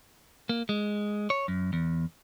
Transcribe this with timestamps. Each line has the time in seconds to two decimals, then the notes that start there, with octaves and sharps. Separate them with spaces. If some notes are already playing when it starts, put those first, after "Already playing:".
0.49 A#3
0.69 G#3
1.30 C#5
1.48 F#2
1.73 E2